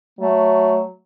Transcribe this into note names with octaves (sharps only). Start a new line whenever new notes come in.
F#3 A3